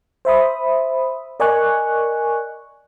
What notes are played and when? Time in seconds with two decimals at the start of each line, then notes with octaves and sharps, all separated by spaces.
0.25 C5 E5 B5 D#6
1.40 A#4 D5 D#5 G#5 C#6 F#6